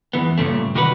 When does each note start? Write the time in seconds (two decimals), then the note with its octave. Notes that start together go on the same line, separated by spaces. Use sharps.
0.13 E2 E3 B3
0.38 G2 A#2 C#3 A3
0.75 C3 D#3 G3 F#4 A#4 B4